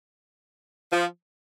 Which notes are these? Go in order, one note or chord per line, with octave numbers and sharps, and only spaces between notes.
F3